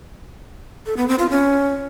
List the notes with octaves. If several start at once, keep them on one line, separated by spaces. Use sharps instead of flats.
A4
B3
C4
F4
C#4